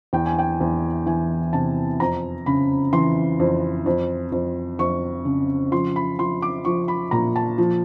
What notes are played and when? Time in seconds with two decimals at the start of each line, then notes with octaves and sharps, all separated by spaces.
0.13 E2 G5
0.26 G#5
0.39 G5
0.61 E2
1.06 E3 G#5
1.53 C3 A5
2.00 F2 A#5
2.46 C#3 B5
2.93 E3 C6
3.40 F2
3.86 F2
4.32 F2
4.79 F2 C#6
5.25 C#3
5.72 F3 C6
5.96 B5
6.19 F3 C6
6.42 D6
6.65 F3 C#6
6.88 B5
7.11 A#2 A#5
7.36 A5
7.58 F3